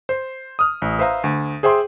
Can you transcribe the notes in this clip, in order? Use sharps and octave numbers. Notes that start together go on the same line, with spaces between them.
C5
D#6 F6
A1
B4 C5 E5 F5 A#5
D2
G#4 C5 E5 G5 C6 D6